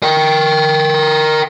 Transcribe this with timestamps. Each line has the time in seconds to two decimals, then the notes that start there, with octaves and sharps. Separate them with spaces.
0.03 A#4 G5